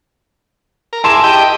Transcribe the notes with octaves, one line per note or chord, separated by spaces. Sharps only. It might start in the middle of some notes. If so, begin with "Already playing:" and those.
A#4
E4 G#4 A5 C6 D6 E7
G4 D#5 G5